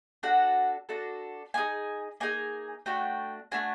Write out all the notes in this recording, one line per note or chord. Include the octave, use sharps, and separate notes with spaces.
D4 F#4 A4 F#5
D4 F#4 A4
A#3 D#4 G#4 G#5
A#3 D#4 G#4 G#5
A3 D4 F#4 G5
A3 D4 F#4 G#5